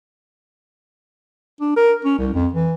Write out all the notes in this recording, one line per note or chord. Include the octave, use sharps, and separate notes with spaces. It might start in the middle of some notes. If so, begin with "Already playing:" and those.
D4
A#4
C#4
C2
F2
E3